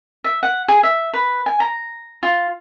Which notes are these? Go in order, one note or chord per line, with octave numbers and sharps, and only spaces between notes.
E5
F#5
G#4
E5
B4
G#5
A#5
F4